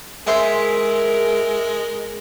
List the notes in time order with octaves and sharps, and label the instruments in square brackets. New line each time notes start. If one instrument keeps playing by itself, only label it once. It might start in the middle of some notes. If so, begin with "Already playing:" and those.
[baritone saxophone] G#3 [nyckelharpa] A#4 [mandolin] C5 E5 G#5